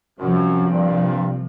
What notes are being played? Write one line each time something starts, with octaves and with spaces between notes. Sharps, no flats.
C2 F#2 C3 F3
G2 A#2